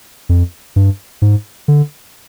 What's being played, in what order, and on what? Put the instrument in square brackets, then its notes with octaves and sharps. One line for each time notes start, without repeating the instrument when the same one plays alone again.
[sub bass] F2
G2
G#2
D3